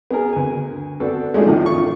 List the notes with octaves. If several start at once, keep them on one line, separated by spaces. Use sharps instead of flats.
B3 G#4 A#4
D2 G#5
B3 C4 D4 F#4 A4
G#3 A3 C4 D4 D#4 F4
E2 A2 D3 D#3 F3
F4 C#6